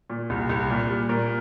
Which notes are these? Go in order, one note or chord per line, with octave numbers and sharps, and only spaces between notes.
A#2
C2
C2
A#2
G3
A#2 A#4